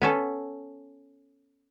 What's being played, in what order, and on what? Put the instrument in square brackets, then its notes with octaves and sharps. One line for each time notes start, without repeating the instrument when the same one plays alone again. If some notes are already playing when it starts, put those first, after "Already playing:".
[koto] B3 C#4 A4